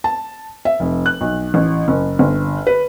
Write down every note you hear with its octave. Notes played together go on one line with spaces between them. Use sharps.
A5
E5
F1
F#6
B1
A1
F#1
G1
B4